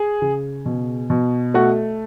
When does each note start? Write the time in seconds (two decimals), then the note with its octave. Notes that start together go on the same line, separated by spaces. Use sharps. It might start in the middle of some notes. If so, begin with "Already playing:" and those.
Already playing: G#4
0.22 C#3
0.65 B2
1.10 B2
1.54 A3 F#4